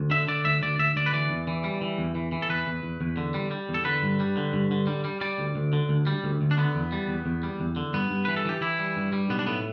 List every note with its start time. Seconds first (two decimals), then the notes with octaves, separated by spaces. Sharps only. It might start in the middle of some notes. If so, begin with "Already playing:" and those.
Already playing: D2
0.11 D3 E5
0.28 D3 D5
0.45 D2 E5
0.62 D2 D5
0.79 D2 E5
0.96 D2 D5
1.06 B4
1.13 E3 D5
1.30 E2
1.47 E3
1.64 G3
1.81 E3
1.98 E2
2.15 E3
2.32 E3
2.42 A4
2.49 E2 B4
2.67 E2
2.83 E2
3.01 E2
3.17 D3
3.34 G3
3.51 G3
3.69 E2
3.74 A4
3.85 D3 B4
4.03 G2
4.20 G3
4.37 D3
4.53 G2
4.71 D3
4.87 G3
5.05 G3
5.21 G3 D5
5.38 D2
5.56 D2
5.73 D3
5.89 D2
6.07 G3
6.24 D2
6.41 D2
6.51 D4
6.58 D3 B3
6.75 E2
6.92 G3
7.09 E2
7.26 E2
7.43 G3
7.60 E2
7.76 D3
7.94 G2 B3
8.11 G2
8.25 E3 B4
8.36 A4
8.45 E3 G4
8.61 E3 E4
8.79 G3
8.96 G2
9.13 G3
9.30 B1 B3
9.39 D4
9.47 A2 B3